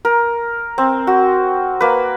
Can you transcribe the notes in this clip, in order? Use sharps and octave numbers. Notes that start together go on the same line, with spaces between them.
A#4
C4
F#4
A#3 B4